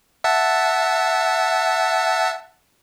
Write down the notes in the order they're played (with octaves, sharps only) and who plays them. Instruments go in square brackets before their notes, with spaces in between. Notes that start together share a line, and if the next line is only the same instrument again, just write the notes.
[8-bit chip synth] E5 F#5 A5